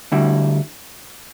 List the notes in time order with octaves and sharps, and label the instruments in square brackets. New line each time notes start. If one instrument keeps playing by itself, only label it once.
[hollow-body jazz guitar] D2 D3 G3 E4